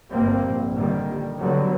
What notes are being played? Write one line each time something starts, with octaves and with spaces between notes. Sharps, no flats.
G1 G2 C3 G3 A#3 C4
A#1
A#2 D3 D#3 G3
D3 D#3 F#3 G3 B3